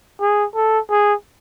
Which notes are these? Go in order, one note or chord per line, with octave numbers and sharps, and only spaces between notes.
G#4
A4
G#4